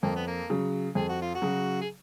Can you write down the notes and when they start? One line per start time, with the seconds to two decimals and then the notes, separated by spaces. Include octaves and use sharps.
0.03 F2 A#3
0.16 B3
0.27 A#3
0.50 C#3 F#3
0.95 F2 G#4
1.09 F#4
1.21 F4
1.35 F#4
1.42 C#3 F#3
1.81 G#4